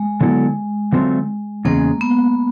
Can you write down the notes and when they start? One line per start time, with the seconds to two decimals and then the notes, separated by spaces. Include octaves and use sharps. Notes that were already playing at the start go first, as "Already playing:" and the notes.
Already playing: G#3
0.21 D3 F#3 B3 E4 A4
0.92 D3 F#3 A3 C4 F4
1.65 E2 C#3 G#3 A#3
2.01 B3